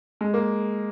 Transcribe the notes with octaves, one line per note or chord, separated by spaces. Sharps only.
G#3
A#3